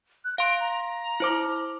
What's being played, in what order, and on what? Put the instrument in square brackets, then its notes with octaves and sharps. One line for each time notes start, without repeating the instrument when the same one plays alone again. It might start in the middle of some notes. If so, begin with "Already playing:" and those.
[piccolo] F#6
[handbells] F5 C6 [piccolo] D7
[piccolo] A#5
[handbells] E4 C5 D6